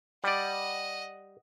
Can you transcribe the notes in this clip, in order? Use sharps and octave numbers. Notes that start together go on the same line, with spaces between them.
G3 D5 D#5 F#5